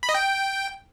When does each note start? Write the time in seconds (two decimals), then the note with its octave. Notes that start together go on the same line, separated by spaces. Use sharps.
0.03 B5
0.09 D#5
0.15 G5